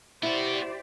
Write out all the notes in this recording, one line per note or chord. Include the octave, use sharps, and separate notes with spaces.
B3 E4 F#4 G4 C5 D5